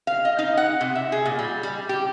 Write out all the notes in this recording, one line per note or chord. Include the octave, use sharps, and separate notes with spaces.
F5
D#5
D#4
F#5
C3
E5
G#4
A#2
G3
G3
G4